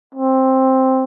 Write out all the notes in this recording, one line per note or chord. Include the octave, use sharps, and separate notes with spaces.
C4